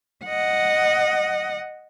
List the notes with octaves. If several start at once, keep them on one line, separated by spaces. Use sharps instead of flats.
D#5 F#5